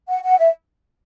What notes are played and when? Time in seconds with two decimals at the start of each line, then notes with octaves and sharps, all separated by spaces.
0.09 F#5
0.23 F#5
0.38 E5